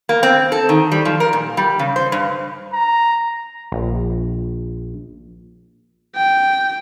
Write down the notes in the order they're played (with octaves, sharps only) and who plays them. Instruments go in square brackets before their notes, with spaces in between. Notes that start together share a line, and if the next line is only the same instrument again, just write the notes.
[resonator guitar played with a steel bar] A#3
C4
A4
D#3
G3
F3
A#4
A#2
G3
C#3
C5
G2
[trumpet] A#5
[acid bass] A#1
[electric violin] G5